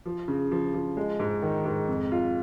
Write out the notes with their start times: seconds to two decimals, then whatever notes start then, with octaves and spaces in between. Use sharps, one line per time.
0.06 F3
0.28 C#3
0.51 F3
0.74 F3
0.97 G#3
1.20 G#2
1.42 D#3
1.65 G#2
1.88 F2
2.12 F4